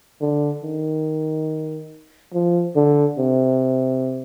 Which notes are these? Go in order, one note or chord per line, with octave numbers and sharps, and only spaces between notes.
D3
D#3
F3
D3
C3